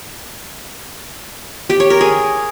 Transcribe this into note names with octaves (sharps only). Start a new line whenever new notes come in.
G4
C#5
A#4
G#4